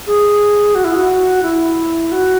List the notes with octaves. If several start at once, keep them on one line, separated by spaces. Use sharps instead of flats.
G#4
F#4
E4
F#4
E4
F#4